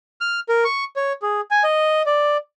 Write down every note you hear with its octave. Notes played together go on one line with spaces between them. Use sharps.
F6
A#4
C#6
C#5
G#4
G#5
D#5
D5